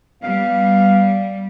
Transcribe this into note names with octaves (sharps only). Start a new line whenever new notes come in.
G3 B3 F5